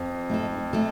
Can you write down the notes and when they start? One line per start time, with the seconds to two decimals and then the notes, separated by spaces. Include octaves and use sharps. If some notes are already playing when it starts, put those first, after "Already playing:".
Already playing: F2
0.30 A3 D#4 A4
0.73 A3 D#4 A4